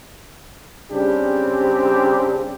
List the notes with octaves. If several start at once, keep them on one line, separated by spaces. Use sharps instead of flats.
C#3 G3 C4 D4 G4